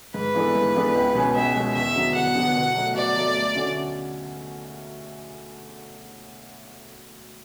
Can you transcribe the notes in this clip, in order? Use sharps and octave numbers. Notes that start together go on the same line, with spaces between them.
G#2 B4
E3 B3 D4 A4
G#2
E3 B3 D4 A4
C#2
B2 G#3 C#4 G#4
C#2 E5
B2 G#3 C#4 G#4
E2 E5
D3 F#3 B3
E2 F#5
D3 F#3 B3
B2
F#3 A3
B2 D5
F#3 A3
D2
D3 A3 C#4 F#4